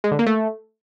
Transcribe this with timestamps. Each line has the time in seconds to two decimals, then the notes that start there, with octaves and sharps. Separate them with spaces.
0.04 G#3
0.11 D3
0.19 A#3
0.26 A3